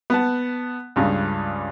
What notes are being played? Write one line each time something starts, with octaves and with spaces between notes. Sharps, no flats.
B3 F#5 A5
C#2 G2 C#3